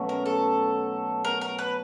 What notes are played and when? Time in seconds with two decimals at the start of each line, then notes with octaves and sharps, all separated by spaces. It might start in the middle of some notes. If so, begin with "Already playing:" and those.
Already playing: B2 F#3 A3 C#4
0.09 A#4
0.26 A4
1.25 A#4
1.41 A#4
1.59 B4